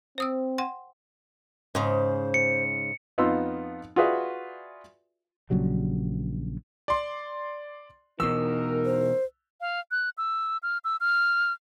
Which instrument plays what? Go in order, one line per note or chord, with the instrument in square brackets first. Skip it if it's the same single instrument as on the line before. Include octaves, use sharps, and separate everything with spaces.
[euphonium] C4 [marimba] C5 D#6 E6
[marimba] F#5 G5 C6
[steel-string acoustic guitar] G#2 C#3 [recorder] C5
[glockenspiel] C#7
[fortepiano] F2 B3 D#4 F4 C6 E6
F4 F#4 G#4 B4 D5 E5
[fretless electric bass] A#1 C#3 F#3 G3
[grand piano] D5 C6
[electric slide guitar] E2 B2 [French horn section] D#4 A#4 [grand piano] E6
[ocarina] C5
[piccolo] F5
F#6
E6
F6
E6
F6